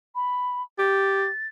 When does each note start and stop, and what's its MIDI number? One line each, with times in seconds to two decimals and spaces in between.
0.15 0.62 83
0.79 1.27 67
0.79 1.47 93